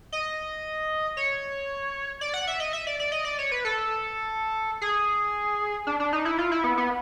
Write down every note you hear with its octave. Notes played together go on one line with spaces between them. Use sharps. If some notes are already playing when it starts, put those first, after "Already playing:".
D#5
C#5
D5
F#5
E5
D#5
E5
D5
D5
D#5
D5
C#5
B4
A4
G#4
D4
D4
D#4
E4
F4
E4
B3
B3